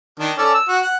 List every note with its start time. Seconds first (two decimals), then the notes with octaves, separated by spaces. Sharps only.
0.19 D#3 D4
0.38 C#4 A4 D5
0.54 E6
0.68 F#4
0.82 F#5